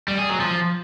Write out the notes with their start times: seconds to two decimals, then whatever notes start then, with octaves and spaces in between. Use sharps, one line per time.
0.08 G3
0.19 G#4
0.29 F#3
0.40 F3